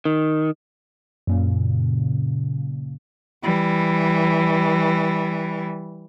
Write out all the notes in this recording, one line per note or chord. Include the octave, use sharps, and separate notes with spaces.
D#3
F#2 A#2 C#3
E3 G3